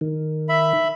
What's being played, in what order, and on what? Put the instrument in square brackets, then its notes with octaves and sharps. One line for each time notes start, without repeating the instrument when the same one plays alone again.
[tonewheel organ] D#3
[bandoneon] E5 B5